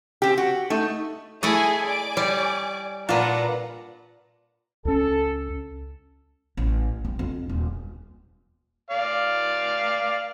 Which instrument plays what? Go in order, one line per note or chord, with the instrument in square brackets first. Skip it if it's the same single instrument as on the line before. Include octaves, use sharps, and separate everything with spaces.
[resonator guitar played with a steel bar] C4 G4
F#4
A3 D#4
[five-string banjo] A3 [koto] E4 A4 D#5 [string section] G#4 G#5
[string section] D5 G#5 D6
[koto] G3 [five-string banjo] C#5
[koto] A#2 D4 [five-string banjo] F4 [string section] B4 F#5 A#5
[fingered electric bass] C#2 C#4 [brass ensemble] A4
[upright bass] A1
C4
F2
D#1
[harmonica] D5 F5